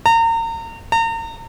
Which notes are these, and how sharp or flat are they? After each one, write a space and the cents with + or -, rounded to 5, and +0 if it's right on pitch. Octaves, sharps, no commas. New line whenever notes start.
A#5 -35
A#5 -40